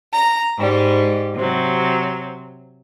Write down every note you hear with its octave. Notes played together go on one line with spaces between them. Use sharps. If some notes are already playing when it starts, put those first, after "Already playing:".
A#5
G#2 G3
C3 F#3